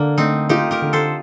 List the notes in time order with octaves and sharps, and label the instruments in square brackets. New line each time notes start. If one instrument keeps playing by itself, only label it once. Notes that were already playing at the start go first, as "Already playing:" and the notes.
Already playing: [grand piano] D3 D4 [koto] A#3
[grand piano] A3 [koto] C4 D#4
[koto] D#4 G4 [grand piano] F4
[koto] G4 A#4
[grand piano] D3
[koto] A4 C5